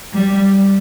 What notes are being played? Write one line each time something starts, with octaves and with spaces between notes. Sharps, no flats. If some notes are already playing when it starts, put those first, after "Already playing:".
G3